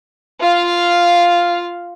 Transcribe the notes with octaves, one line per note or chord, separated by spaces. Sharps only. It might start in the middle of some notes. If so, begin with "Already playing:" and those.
F4 F5